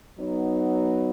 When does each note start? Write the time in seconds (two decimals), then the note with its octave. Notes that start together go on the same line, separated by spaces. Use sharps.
0.18 F#3 B3 D#4